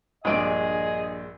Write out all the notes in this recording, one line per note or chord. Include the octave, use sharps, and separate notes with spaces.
A#1 G2 G#3 G#4 D5 D#5